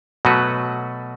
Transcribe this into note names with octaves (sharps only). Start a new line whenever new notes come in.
B2 F#3 A3 F#4 B4